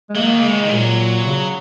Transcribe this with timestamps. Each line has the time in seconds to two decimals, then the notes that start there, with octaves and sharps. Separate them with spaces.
0.10 G#3
0.16 F#3 A#3
0.27 D#3
0.37 C#3
0.43 G#3
0.49 D#3
0.63 D#3
0.70 A#2 F#3
1.25 C#3